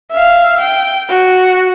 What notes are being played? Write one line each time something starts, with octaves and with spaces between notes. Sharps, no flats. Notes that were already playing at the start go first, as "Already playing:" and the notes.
E5 F5
G5
F#4